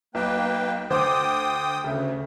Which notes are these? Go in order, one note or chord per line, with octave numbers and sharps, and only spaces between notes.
B1 A#3 B4 G5
D2 C5 G5 D6 D#6
D2 C#3 A3